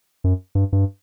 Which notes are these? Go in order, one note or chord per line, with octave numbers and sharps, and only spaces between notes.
F#2
G2
G2